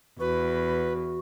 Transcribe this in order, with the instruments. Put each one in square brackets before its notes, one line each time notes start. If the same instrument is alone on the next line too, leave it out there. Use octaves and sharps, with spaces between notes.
[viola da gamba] E2 [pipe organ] F#4 [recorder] B4